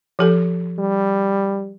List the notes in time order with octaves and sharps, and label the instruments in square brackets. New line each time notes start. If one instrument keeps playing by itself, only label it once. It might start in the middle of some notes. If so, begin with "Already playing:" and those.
[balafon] F3 G4 A4
[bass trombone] G3